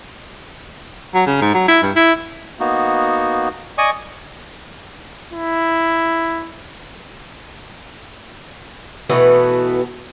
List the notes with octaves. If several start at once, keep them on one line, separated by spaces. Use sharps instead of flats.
F#3
C#3
G#2
F#3
E4
G2
E4
A#3 B3 D#4 F#4
D5 D#5 G#5 C#6 D#6
E4
B2 E3 A3 B3